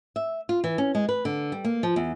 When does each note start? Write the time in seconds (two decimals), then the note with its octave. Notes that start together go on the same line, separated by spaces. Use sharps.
0.16 E5
0.49 F4
0.64 E3
0.78 C#4
0.95 G#3
1.09 B4
1.25 D3
1.52 G3
1.65 A#3
1.83 F3
1.96 E2